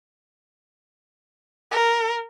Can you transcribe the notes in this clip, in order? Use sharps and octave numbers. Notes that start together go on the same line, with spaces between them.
A#4